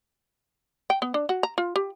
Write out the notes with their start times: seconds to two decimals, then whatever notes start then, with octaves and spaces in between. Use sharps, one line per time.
0.90 G5
1.02 B3
1.14 D4
1.29 F#4
1.43 A#5
1.58 F4
1.76 G4